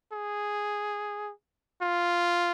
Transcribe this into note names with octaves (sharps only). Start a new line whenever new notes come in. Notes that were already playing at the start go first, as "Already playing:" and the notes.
G#4
F4